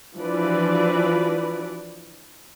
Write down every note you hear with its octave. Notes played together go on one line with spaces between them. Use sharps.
E3 F3 D4 F#4 B4 D5